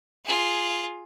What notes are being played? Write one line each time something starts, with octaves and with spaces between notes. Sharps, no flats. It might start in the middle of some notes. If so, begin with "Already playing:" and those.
F4 G#4